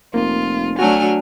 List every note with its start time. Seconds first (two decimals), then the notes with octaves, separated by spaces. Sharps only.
0.14 F1 A#3 F4
0.79 F#3 A3 D4 F#4 G#5 F6